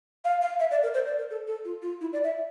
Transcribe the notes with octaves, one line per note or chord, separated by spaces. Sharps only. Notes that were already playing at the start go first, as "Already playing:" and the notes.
F5
F5
E5
D5
A#4
C5
D5
A#4
A4
A4
F4
F4
E4
D5
E5